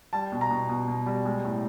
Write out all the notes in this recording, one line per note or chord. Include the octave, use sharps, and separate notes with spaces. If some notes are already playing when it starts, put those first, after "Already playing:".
G3 A5
B2
A#5
B2
B2
B2
G3
G#3
A2